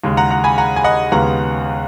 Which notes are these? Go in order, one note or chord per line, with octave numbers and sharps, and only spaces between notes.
D#2 C#3 G#3
F#5 A#5
F#5 A#5
G#5 B5
F#5 A#5
G#5
D#5 F#5
D#2 C#3 G#3 B3 F#5 A#5